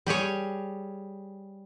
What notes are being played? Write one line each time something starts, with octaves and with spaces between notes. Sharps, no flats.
G3 G4 G#4 C#5